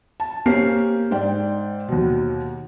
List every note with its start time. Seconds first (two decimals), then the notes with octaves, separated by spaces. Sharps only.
0.20 A5
0.46 A#3 C4 C#4 G4 C7
1.11 G#2 D5 G5
1.88 D#2 B2